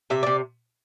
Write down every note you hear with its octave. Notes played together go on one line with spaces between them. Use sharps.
C3 E5
C3 D5